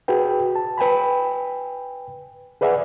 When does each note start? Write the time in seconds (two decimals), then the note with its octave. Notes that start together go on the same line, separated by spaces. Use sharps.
0.08 F#4 G#4 B4 G5
0.56 A5
0.78 B4 G5 G#5 B5
2.61 G#4 B4 D5 E5 F#5 G#5